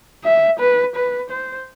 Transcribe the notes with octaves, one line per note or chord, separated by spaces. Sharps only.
E5
B4
B4
C5